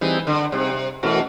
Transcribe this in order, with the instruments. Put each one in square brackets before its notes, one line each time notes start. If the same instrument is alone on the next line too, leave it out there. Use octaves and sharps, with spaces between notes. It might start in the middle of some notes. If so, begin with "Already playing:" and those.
[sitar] E3 [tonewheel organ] G3 C4 D#4 G#4
[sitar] D3
[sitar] C3 [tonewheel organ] G3 C4 D#4 G#4
[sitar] B2 [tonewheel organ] E3 A3 C#4 F#4 A#4